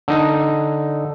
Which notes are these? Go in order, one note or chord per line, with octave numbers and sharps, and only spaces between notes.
D3 D#4